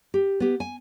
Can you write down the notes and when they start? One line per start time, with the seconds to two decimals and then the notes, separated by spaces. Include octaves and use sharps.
0.14 G4
0.40 B3 G4
0.60 G#5